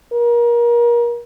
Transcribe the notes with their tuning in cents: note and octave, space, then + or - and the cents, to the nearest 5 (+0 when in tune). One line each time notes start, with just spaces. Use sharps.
A#4 +30